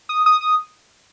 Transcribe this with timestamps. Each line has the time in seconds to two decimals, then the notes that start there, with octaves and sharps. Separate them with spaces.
0.09 D#6
0.26 D#6
0.41 D#6